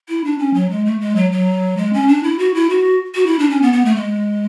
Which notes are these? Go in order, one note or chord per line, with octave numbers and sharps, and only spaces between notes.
E4
D4
C#4
F#3
G#3
A3
G#3
F#3
F#3
G#3
C#4
D4
E4
F#4
E4
F#4
F#4
E4
D4
C#4
B3
B3
A3
G#3